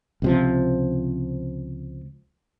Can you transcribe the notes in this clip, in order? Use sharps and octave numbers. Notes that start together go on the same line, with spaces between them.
C#2 C3 F3